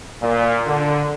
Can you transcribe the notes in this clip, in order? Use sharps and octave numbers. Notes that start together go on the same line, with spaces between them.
A#2
D3